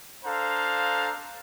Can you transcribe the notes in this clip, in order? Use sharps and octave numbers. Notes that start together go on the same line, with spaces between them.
D4 A4 C5 F5 A#5